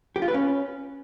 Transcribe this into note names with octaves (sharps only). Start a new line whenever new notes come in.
G4
F4
B4
C#4